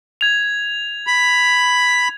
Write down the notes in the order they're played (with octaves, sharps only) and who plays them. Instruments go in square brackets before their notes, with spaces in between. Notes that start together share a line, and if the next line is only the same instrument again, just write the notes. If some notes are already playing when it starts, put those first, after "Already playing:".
[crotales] G#6 F7
[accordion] B5